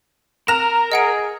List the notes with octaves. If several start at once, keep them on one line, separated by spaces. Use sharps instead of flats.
A#4 A#5 F6 A#6 E7 F7
G#4 D#5 F#5 D7